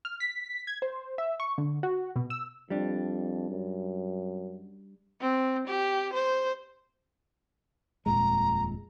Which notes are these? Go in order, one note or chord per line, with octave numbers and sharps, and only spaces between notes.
F6
B6
G#6
C5
E5
C#6
D3
F#4
B2
E6
F2 G3 D4
F#2
C4
G4
C5
D#1 F2 A#2 G#3 A#5